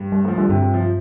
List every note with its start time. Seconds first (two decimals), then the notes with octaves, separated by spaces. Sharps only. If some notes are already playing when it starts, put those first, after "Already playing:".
Already playing: G2
0.12 G3
0.25 F3 A3
0.38 D3 G3
0.49 G2 C3
0.62 C3
0.74 F3